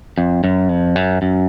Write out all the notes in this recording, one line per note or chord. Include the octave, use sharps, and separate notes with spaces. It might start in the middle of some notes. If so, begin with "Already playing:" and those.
F2
F#2
F2
F#2
F#2